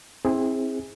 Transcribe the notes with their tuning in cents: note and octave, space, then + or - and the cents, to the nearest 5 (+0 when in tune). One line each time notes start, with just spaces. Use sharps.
C4 +15 E4 -30 G#4 -15